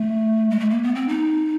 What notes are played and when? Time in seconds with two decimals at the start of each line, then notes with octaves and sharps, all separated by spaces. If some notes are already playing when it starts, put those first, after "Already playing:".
Already playing: A3
0.50 G#3
0.60 A3
0.70 A#3
0.83 B3
0.95 C4
1.09 D#4